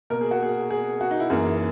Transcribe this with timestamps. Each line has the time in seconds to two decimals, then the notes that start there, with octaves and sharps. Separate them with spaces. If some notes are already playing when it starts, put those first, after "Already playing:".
0.10 B2 A#3 A#4
0.21 G#4
0.31 F#4
0.43 G#4
0.71 G#4
1.01 F#4
1.11 D#4
1.20 E4
1.30 F#2 E3 A#3 G#4